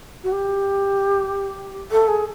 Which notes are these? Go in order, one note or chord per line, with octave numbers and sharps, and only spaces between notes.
F#4
G4
A4
G#4